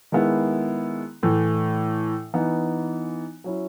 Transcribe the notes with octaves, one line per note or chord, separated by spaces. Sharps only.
D#3 G#3 B3 E4
A2 E3 A3
E3 B3 D#4
F#3 C#4 E4